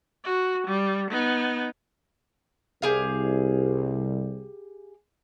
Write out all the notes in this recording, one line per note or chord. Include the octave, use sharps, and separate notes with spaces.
F#4
G3
B3 D#4
C2 G4 G#4 F5